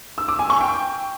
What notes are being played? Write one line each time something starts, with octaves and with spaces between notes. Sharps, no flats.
E6
D6
G#5
C#6
G5